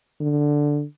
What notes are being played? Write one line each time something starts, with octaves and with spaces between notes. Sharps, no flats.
D3